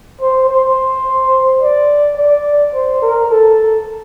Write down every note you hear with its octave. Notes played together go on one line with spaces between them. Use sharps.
C5
C5
D5
D5
C5
A#4
A4